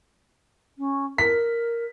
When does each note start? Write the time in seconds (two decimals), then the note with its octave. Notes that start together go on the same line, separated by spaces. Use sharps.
0.78 C#4
1.18 A#4 B6